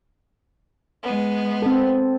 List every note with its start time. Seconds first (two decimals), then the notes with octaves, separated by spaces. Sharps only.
1.03 G#3 B3
1.62 C4 A4